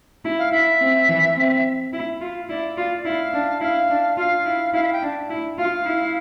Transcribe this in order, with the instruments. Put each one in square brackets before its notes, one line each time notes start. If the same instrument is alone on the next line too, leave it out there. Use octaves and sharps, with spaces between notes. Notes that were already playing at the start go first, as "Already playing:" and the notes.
[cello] E4
[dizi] F5
[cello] E4 [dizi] E5
[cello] C4
E3
C4
E4
F4
[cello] E4 [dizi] D5
[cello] F4
[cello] E4 [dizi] F5
[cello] D4
[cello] E4 [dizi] F5
[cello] D4
[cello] F4 [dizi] F5
[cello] E4
[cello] E4 [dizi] F5
[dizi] E5
F5
G5
[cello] D4
E4
[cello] F4 [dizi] F5
[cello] E4